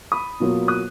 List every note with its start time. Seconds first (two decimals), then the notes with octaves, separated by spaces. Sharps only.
0.12 B5 D#6
0.40 B2 F#3 A#3 F4
0.68 D#6 F#6